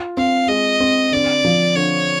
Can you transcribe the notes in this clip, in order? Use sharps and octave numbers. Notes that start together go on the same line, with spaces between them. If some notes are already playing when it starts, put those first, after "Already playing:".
Already playing: F4
C4 F5
G#3 D#5
C4
D3 D5
F3
D3 C#5